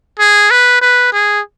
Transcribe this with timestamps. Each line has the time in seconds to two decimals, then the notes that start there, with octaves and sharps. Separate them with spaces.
0.20 G#4
0.51 B4
0.82 B4
1.13 G#4